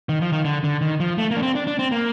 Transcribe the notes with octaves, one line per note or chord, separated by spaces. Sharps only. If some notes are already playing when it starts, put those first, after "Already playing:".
D#3
F3
D#3
D3
D3
D#3
F3
A3
A#3
D4
C4
D4
D4
C4
A#3